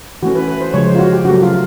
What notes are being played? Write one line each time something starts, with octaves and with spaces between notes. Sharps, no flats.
E3 A3 C#4 F#4
B4
B4
C5
C#3 F3 G#3 C#5
C5
F4
F#4
G4
C#3 F#3 A3 F#4
F4